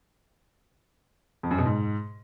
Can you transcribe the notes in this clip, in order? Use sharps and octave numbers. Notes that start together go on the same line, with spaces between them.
F2
F#2
B2
G#2